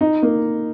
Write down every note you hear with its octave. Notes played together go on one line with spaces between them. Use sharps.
D#4
A#3